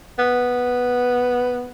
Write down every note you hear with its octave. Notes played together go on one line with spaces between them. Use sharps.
B3